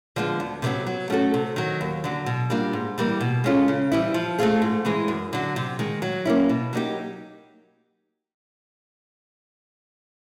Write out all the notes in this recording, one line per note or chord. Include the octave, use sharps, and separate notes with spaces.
D3 F3 G#3 B3
D2
C3 D#3 F#3 B3
F#3
A3 C#4 F#4 A4
C3
D#3 F#3
D#2
D3 F#3
B2
G3 A#3 D4 F4
G#2
E3 G3 A#3
B2
G#3 C#4 F4 A4
C#3
E3 G3 C4 E4
F3
A3 C4 F4 G#4
G#2
E3 G#3 C4
F#2
D3 F#3
C3
D#3 G#3
F#3
A#3 C#4 E4
B2
F#3 A#3 D#4 G4